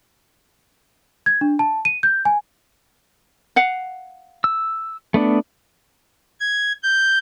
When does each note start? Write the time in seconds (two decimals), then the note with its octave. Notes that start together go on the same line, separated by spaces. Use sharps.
1.26 G#6
1.41 D4
1.59 A5
1.85 D#7
2.03 G6
2.25 G#5
3.56 F5 F#5
4.44 E6
5.14 A3 B3 D4
6.40 G#6
6.83 G6